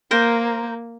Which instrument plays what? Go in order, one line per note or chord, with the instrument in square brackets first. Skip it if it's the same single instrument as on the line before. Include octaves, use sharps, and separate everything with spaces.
[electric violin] A#3 [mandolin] A#4 C5